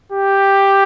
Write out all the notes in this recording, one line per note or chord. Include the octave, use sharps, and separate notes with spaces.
G4